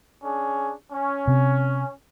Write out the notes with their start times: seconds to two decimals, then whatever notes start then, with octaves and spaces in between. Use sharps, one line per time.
0.24 C#4 D4 G#4
0.93 C#4
1.28 C3